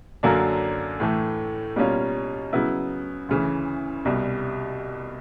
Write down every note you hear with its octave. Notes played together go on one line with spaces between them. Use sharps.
F#2 D3 F#3 A#3 D4
A2 E3 A3
B2 G3 A#3 C#4 F4
C#3 F#3 B3 E4
D2 C#3 E3
C2 B2 G3